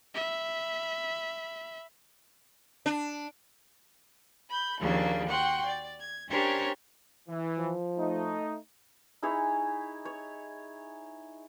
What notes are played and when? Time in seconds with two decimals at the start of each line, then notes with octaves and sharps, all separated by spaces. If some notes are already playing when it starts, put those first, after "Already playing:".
0.14 E5 B5
2.86 D4
4.50 B5 G6
4.80 D#2 C#3 F3 A#3 D4
5.28 F#4 F#5 G5 C6
5.66 D5
5.99 G#6
6.29 C#4 D4 G4 A#4 C5 C#5
7.29 E3
7.58 F3
7.98 A3 D#4
9.22 D#4 E4 G#4 C#5
10.05 C#5